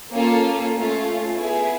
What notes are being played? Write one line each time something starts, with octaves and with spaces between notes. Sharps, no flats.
A#3 C#4 F4 A4
A3 C#4 F4
B3 E4 G#4